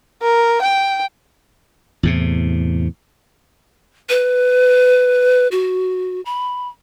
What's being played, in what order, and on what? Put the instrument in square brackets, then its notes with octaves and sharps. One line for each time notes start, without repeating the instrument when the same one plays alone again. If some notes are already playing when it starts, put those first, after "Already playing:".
[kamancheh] A#4
G5
[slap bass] E2 A2 C3
[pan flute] B4
F#4
B5